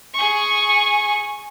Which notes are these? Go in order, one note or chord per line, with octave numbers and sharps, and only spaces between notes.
G#4 C#6